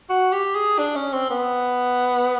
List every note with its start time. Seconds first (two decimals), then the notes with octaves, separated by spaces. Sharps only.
0.09 F#4
0.32 G4
0.55 G#4
0.78 D4
0.95 C#4
1.13 C4
1.30 B3